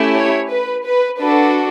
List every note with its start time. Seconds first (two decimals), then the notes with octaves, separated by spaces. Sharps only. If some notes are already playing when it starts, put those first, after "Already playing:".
Already playing: A3 C#4 E4 G4
0.14 C#5
0.50 B4
0.84 B4
1.19 D4 F#4 A4 B4